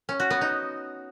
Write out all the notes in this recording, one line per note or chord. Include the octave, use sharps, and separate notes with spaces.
C#4
F#4
B3
D#4